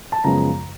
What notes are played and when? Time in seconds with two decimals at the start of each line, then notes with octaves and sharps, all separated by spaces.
0.12 A5
0.24 F#2 C#3 F3 G#3 B3 A#5